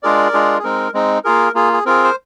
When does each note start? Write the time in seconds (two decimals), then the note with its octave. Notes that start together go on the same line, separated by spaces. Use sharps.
0.03 G#3 D4 F4 G#4 A#4 D5
0.33 G#3 D4 F4 G#4
0.59 G#4
0.64 G#3 C4 D#4 A#4
0.94 G#3 C4 D#4
1.24 A#3 F4 G#4 A#4
1.55 A#3 F4 G#4
1.73 G#4
1.85 C4 F4 G#4 A#4
2.04 C5